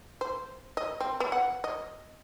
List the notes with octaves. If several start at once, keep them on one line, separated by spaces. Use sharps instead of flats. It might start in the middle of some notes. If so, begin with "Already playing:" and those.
C5
D#5
C4
B3
F#5
D#5